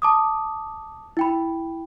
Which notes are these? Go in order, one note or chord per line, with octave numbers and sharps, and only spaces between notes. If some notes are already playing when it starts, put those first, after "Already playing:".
A5 D6 D#6
E4 G5 B5